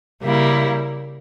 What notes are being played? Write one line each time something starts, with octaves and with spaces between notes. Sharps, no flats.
C#3 G3 A#3 E4